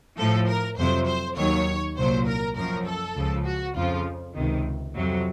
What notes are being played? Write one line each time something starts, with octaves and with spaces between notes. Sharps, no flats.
A2 F3 A4
A#4
F2 C3 F#3 C5
C5
D#2 D#3 F#3 C#5
C2 A#2 F#3 C5
A#4
F#2 F3 A#4
A4
C#2 C#3 F3
F#4
F2 C#3 F3 F4
C#2 C3 D#3
F2 C3 F#3